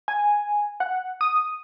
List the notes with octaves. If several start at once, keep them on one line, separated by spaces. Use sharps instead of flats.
G#5
F#5
D#6